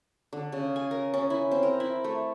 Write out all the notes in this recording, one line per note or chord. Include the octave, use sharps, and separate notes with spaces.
D3
C#3
G#5
A#4
C#4
E4
C4
A#4
E4
A3